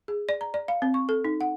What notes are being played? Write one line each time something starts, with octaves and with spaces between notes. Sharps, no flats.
G#4
D5
A#5
D5
F5
C4
C#6
A4
D#4
F#5